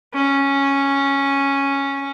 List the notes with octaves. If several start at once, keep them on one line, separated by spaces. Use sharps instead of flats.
C#4